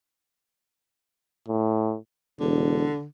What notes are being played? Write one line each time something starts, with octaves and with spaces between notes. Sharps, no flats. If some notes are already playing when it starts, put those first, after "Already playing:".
A2
E1 D3